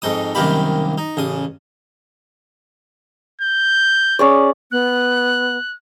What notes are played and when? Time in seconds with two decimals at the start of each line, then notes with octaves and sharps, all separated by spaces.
0.02 F2 G#2 D#4 D#6
0.35 C2 F#2 D#3 A#3 G4 B5
0.98 D#4
1.17 A1 C#3 D#6
3.41 G6
4.19 C#4 G#4 D5
4.72 B3 F#6